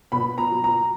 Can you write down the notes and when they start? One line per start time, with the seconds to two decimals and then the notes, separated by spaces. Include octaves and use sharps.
0.12 B2 B5
0.38 A#5
0.51 F#3
0.64 A#5